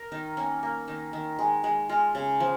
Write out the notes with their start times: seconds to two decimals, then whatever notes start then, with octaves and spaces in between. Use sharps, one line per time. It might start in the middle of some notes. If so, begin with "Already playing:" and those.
Already playing: A#4
0.12 D#3 D#4
0.37 A#3 C#4
0.63 A#3
0.88 D#3 D#4
1.13 D#3
1.39 G#3
1.64 G#3
1.89 G#3 F4
2.15 C#3
2.40 F3